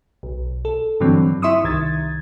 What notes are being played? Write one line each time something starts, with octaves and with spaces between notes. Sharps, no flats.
B1
A4
G2 D3 E3 F#3 C4
E4 E5 C6 C#6 D#6 E6
C2 D#3 G#6 A6